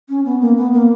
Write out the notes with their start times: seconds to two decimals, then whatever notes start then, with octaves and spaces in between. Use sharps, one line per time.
0.09 C#4
0.25 B3
0.41 A#3
0.57 B3
0.73 A#3